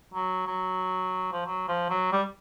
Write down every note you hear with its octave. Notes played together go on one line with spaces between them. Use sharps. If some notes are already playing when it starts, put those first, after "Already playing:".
F#3
F#3
F3
F#3
F3
F#3
G3